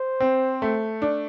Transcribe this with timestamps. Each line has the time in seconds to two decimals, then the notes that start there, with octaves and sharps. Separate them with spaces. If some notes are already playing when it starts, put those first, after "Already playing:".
Already playing: C5
0.20 C4
0.62 A3
1.02 D4